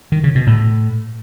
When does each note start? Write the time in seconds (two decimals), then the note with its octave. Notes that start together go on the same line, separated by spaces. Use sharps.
0.12 D#3
0.24 C#3
0.35 B2
0.47 A2